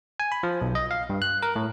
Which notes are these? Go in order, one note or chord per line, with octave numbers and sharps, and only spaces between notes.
G#5
B5
F3
B1
D#5
F5
G2
F#6
A#4
A2